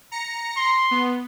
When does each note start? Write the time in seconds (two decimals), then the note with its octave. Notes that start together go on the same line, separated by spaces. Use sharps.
0.12 A#5 A#6 C#7
0.57 C6
0.91 B3